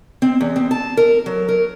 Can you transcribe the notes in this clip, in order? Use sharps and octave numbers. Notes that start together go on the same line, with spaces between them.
C4
E2
C4
A5
A#4
F#3
A#4